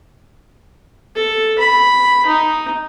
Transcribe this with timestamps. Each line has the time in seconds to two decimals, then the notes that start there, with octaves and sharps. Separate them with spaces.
1.15 A4
1.59 B5
2.26 D#4